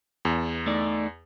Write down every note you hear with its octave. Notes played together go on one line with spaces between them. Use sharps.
E2
A3 D#4 D5